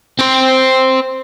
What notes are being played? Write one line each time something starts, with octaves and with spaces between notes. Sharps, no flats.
C4 C5